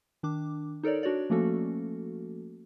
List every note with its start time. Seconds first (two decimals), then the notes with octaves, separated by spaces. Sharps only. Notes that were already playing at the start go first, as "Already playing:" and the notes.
0.23 D#3 D4 D6
0.83 D#4 A4 A#4 C#5 D5
1.03 D4 F#4 C#5 D5
1.30 F3 A3 A#3 C#4 F#4 A4